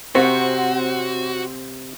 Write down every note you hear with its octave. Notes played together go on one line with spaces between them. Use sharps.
C3 C4 F#4 C#5 F#5 C#6